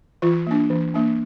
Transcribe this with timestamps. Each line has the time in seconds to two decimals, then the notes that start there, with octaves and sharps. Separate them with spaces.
0.22 E3 F4
0.46 A#3 D4
0.70 E3
0.94 A#3 D4